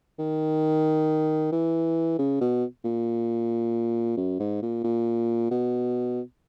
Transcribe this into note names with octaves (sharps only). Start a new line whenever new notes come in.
D#3
E3
C#3
B2
A#2
F#2
G#2
A#2
A#2
B2